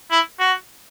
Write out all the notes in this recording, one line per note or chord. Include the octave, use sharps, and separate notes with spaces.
E4
F#4